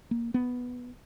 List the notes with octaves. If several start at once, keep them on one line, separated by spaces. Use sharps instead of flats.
A#3
B3